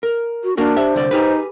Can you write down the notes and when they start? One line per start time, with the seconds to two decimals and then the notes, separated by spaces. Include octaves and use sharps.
0.03 A#4
0.44 F#4
0.57 A#3 D4 F#4 A#4
0.76 G4 C5 E5
0.95 C2 D3 D5
1.11 D#4 G4 G#4 B4